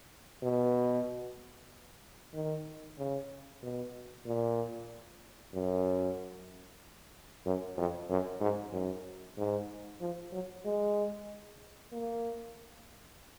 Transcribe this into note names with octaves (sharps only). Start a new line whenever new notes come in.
B2
D#3
C#3
B2
A#2
F#2
F#2
F2
F#2
G#2
F#2
G#2
F3
F#3
G#3
A#3